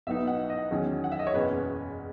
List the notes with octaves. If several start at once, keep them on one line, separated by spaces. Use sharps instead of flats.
B1 B2 F#3 B3 D#4 E5
F#5
D#5
E2 D#3 F#3 C#4
F#5
E5
D#5
C#5
F#1 E2 B2 A#3 C#4 B4